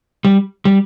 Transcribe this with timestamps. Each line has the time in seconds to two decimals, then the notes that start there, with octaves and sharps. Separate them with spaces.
0.25 G3
0.65 G3